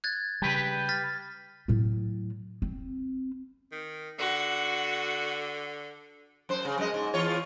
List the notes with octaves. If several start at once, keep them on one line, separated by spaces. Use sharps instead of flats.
F#6 G#6 A6
C#3 G3 G4 B4
F6 A6 B6
A2 F#3
C4
D#3
D3 F#4
F#2 C5
C#3
F#2 G#3 D#5
G#2
E2 F4 C#5